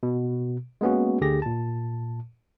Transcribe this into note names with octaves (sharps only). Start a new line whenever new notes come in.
B2
G#3 A#3 B3 C#4 F#4
D2 D3 G4 G#4 A#6
A#2 A5